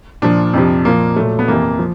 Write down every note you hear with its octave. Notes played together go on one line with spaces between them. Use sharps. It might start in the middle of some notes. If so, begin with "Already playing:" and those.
A#2 F3 D4
F2 C3 F3
A#2 F3 A#3
A#2 F#3 A3
B3
F2 C3 E3 A#3
F3